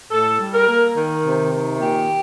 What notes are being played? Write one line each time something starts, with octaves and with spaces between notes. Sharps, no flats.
A2 A4
G3
A#4
A#3
D#3
C3
D#3
A#2 G4